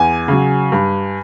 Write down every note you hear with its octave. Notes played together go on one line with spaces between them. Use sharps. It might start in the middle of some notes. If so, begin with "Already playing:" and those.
Already playing: E2 G#5
C#3 F#3
G2